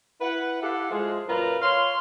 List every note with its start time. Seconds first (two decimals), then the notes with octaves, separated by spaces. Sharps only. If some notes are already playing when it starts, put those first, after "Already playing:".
0.21 E4 B4 F#5
0.62 E4 G4 A4 F5 F#5
0.91 F3 G#3
1.28 F#2 A#2 F4 B4 A#5
1.62 C#5 F5 C6